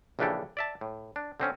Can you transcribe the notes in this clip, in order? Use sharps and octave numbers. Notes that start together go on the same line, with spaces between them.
A#1 C#3 E3 D4 G4 A4
D5 E5 A5
A2
D4
D3 C4 C#4